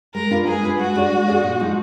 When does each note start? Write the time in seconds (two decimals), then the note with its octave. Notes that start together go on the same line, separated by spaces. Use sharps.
0.14 G#3 A#4
0.31 D4 F4 B4
0.47 G#3 G#4
0.63 D4 F4 B4
0.78 G#3 F#4
0.96 D4 G#4 D5
1.12 G#3
1.28 D4 G#4 D5
1.44 A#2
1.60 F3 G#3 D#4